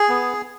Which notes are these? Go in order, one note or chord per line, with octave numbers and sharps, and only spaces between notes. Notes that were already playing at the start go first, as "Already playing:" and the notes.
Already playing: G#4
B3